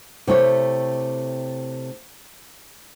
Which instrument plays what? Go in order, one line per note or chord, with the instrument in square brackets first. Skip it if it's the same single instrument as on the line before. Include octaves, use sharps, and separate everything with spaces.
[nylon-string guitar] C3 A3 E4 C#5